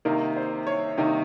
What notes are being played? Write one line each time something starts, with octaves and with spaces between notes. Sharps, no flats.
C3 D#3 A#3 D#4 A#4
C5
C#5
C3 D#3 A#3 D#4